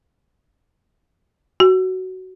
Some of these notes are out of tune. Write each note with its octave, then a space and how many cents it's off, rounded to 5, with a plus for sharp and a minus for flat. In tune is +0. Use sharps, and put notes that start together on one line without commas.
F#4 +10